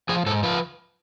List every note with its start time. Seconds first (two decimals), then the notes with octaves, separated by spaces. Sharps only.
0.09 F3 G#4
0.26 G#2 A4
0.43 F3 B4